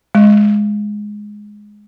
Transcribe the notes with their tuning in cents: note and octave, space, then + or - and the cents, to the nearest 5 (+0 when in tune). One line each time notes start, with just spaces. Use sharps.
G#3 +5